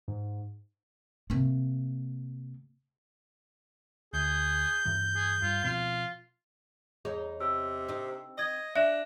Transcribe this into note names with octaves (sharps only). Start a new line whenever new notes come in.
G#2
C3 A#3
D2 G#4 G6
G2 E3 F#3
G#4
G2 F4
B2 F3 C4 F4
E2 D#4 G#4 C#5
C3 E6
C4 D#4
D#5 D#6 G#6
D4 E5 F#6 A#6 E7